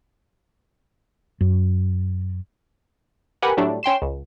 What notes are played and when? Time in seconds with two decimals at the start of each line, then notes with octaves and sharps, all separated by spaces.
1.41 F#2
3.42 G4 A#4 B4 F#5 G#5 B5
3.57 A2 F#3 G3 A3 D4
3.83 C#4 G5 C6 E7
4.02 C#2